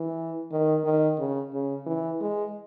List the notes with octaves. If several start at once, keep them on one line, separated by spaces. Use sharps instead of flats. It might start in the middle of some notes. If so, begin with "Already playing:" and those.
Already playing: E3
D#3
D#3
C#3
C#3
E3
G#3